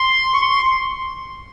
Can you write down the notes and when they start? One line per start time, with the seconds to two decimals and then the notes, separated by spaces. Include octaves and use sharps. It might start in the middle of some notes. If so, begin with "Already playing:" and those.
Already playing: C6
0.34 C#6
0.42 C6